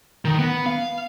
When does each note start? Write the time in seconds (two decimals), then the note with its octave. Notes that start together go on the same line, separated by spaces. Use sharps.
0.25 D#3
0.39 B3
0.66 F5